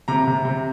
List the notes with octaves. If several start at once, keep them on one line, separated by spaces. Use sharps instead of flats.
C3 A#5
C3
C3